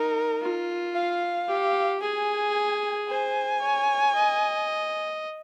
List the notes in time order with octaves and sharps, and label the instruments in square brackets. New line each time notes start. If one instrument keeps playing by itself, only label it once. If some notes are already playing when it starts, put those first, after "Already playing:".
Already playing: [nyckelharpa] D#4 [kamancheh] A#4
[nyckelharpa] F4
[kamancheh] F5
[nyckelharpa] G4
[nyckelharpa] G#4 [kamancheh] G#5
[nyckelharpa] C5 [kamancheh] G#5
[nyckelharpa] C#5
D#5